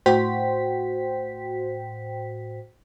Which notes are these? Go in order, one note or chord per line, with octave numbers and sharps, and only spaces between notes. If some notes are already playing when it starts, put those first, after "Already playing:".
A2 F#4 C5 G5 B6